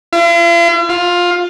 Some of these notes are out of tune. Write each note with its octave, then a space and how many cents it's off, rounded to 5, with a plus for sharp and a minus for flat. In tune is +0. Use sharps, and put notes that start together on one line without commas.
F4 -45
F4 +15